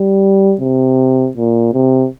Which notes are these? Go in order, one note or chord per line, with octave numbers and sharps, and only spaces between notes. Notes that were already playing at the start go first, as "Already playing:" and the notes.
Already playing: G3
C3
A#2
C3